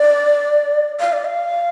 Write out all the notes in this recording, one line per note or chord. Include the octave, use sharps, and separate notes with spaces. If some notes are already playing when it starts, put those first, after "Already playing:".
Already playing: D5
F5
D5
F5